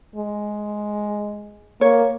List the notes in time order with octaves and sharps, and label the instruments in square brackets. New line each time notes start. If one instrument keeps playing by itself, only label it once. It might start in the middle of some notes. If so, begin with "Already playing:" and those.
[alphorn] G#3
[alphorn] A#3 [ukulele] C#5